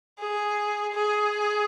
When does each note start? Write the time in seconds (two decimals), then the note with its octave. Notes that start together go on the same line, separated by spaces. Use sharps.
0.19 G#4
0.94 G#4